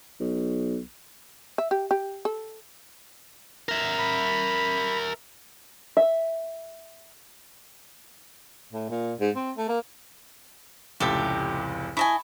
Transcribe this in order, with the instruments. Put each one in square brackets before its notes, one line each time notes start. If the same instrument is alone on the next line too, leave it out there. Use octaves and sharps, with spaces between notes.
[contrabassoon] B1
[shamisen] E5
G4
G4
A4
[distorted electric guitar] A#4 E5
[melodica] B5
[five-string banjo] E5
[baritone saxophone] A2
A#2
G#2
C4
A3
A#3
[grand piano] F1 C#2 A2 [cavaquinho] G4 A4 E5
[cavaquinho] E4 D#5 G#5 [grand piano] A5 B5 C#6